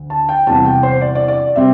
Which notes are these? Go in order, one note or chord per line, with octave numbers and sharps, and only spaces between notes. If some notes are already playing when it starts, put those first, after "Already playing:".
Already playing: D2
A5
G5
E2 C3 G3 A5
G5
C5
D5
D5
D5
C3 G3 C4 E5